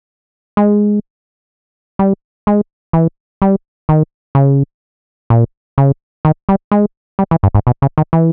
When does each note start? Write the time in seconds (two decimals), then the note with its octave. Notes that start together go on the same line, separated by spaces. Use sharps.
0.57 G#3
1.99 G3
2.47 G#3
2.93 E3
3.42 G3
3.89 D#3
4.35 C#3
5.30 A#2
5.78 C#3
6.25 D#3
6.49 G3
6.72 G#3
7.19 G3
7.31 E3
7.43 G2
7.55 G#2
7.67 B2
7.82 C#3
7.98 D#3
8.13 E3